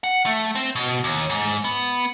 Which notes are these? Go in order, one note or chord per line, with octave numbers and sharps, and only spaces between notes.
F#5
A3
C4
B2
D#2
G#2
B3